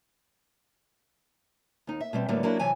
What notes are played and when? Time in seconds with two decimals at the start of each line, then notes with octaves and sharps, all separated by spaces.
1.87 D#2 D#4
2.00 E5
2.13 B2 G3 C4
2.28 A2 D3 F#3 G3 A#3 B3
2.43 F#3 A#3 D4 E4
2.59 C3 E3 F#3 G#5 A5